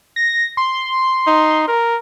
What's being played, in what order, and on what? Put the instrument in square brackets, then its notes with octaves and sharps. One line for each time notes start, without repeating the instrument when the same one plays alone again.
[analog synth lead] A#6
C6
[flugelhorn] D#4
A#4